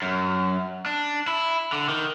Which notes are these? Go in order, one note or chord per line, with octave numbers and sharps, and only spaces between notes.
F#2
D4
E4
D3
D#3